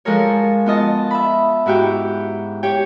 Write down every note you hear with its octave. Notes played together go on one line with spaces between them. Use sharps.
F3 G#3 A4 A#4 C#5
B3 F4 D#5 A5
E5 B5
G#2 E4 F#4 G4 G5
G4 C#5 G5